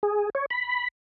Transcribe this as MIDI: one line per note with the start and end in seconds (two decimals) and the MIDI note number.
0.03 0.30 68
0.35 0.46 73
0.50 0.88 83